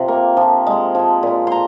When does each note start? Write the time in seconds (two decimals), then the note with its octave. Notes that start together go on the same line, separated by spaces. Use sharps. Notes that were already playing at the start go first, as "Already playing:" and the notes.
Already playing: C3 F3
0.08 A#3
0.37 F3
0.67 G#3
0.95 F3
1.23 A#2
1.47 A#5 C6